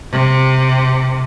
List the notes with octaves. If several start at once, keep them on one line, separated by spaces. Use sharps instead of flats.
C3